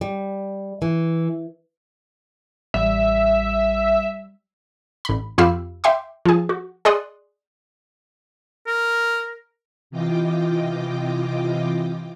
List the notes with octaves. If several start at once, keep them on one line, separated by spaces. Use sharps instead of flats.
G3
E3
A1 G3 E5
A1 B5
F2 F4 G4 F5 B5 E6
E5 G5 C6 D6
F3 G#4
F#4
G#4 D5 D#5 C6 D#6 F#6
A#4
C3 E3 F4 D#5 G5 D6